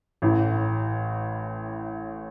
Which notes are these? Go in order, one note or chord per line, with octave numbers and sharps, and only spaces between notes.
A1 A2 E3